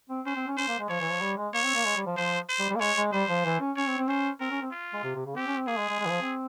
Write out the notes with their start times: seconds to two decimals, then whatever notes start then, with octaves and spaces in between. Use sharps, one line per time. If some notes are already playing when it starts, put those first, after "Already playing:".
0.10 C4
0.25 C#4 C5
0.36 C4
0.47 C#4
0.57 C#4 C5
0.68 A#3
0.79 G#3
0.89 F3 C#5
1.00 E3
1.11 F3
1.21 G3
1.37 G#3
1.54 A#3 C#5
1.64 C4
1.75 A#3
1.85 G#3
1.96 G3
2.06 F3
2.17 F3 C5
2.49 C5
2.59 G3
2.70 G3
2.75 A#3
2.80 G#3 C#5
2.97 G#3
3.13 G3 C5
3.29 F3
3.45 E3
3.60 C#4
3.77 C#4 C#5
3.87 C4
3.98 C4
4.08 C#4 C5
4.40 C4 A#4
4.51 C#4
4.62 C4
4.72 F4
4.93 G#3
5.03 C3
5.15 C3
5.25 C#3
5.36 C4 G4
5.47 C#4
5.57 C4
5.67 A#3 G#4
5.78 G#3
5.89 G#3
6.00 G#3
6.05 E3
6.10 F3
6.21 C4